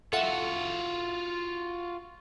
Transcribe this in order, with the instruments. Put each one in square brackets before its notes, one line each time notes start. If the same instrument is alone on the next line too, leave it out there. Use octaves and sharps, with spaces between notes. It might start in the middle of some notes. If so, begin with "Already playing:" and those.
[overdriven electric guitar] F4 F#4 [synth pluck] A4 E5 F#5